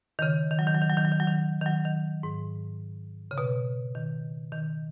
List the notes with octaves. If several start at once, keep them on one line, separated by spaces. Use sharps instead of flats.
D#3
C#3
D#3
F#3
D#3
F#3
D#3
F#3
D#3
F#3
D#3
F#3
D#3
D#3
F#3
D#3
G#2
C#3
B2
D#3
D#3